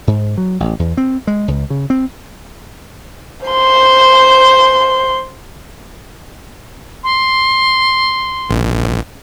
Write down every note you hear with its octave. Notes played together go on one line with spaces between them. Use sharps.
G#2
F#3
A1
E2
C4
G#3
C#2
C#3
C4
C5 C6
C6
A#1